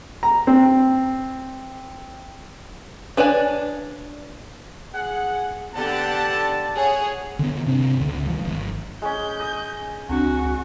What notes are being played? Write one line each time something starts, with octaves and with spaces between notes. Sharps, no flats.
A#5
C4
D4 B4 C#5 D5 G#5
G#4 F#5
D3 B3 G4 F#5 A5
G#4 C#5 F#5
D3 D#3 B3
G#2 C3 C4 D4
C#2 D3
D#3 F3 G#3
G1
G#3 C#4 G6
D#5
C#2 C4 D4 F#4 F#5